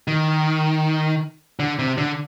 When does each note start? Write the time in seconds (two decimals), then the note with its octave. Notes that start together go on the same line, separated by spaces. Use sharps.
0.08 D#3
1.59 D3
1.79 C3
1.98 D3